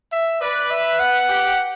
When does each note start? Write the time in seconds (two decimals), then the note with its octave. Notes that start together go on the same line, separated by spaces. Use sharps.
0.12 E5
0.41 B4 D5
0.71 E5
1.00 F#5
1.29 G4